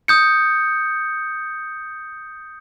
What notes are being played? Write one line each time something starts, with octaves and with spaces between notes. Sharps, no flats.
D#6 G6 C#7